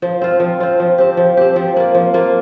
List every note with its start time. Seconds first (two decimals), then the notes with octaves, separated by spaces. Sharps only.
0.02 F3
0.22 C4 F4
0.40 F3
0.60 C4 F4
0.80 F3
0.98 C4 G4
1.17 F3
1.37 C4 G4
1.56 F3
1.76 A#3 F4
1.95 F3
2.14 A#3 F4